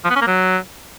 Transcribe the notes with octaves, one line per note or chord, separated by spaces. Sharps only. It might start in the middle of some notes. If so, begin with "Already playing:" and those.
F3
B3
C#4
A#3
F#3